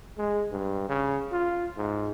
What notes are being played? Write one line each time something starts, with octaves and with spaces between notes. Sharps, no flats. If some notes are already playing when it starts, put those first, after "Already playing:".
G#3
G2
C#3
F4
G#2